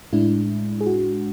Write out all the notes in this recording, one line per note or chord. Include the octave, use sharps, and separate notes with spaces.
A2 G#3 D4 E4
G#4
F#4